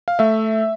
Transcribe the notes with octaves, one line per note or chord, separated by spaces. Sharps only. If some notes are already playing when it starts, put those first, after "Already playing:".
F5
A3 E5